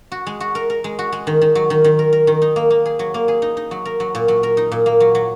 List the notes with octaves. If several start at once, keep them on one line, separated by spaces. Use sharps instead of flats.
F#4
G#3
F#4
A#4
A#4
G#3
F#4
G#3
D#3
D#3
F#3
D#3
D#3
A#4
A#4
D#3
D#4
A#3
A#3
G#4
F#3
A#3
G#4
D#4
D#4
F#3
A#4
F#3
A#2
F#3
A#4
D#4
A#2
A#3
F#3
F#3